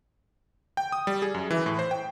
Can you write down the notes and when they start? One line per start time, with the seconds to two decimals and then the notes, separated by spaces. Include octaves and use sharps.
0.77 G5
0.92 D#6
1.07 G3
1.22 G#4
1.34 F#2
1.50 E3
1.66 A2
1.79 C5
1.91 G5